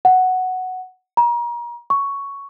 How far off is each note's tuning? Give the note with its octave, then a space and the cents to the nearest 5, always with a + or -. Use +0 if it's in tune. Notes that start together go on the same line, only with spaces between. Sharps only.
F#5 +0
A#5 +35
C#6 +5